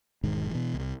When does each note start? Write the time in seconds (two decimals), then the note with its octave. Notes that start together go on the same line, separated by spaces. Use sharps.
0.23 E1 G#2 D#3
0.51 B2 E3
0.74 C2